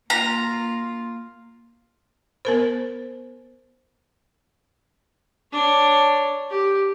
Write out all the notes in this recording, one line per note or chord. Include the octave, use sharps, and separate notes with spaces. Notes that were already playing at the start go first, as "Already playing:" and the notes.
A#3 F4 A#5
B3 A#4 C5
D4 C#5
G4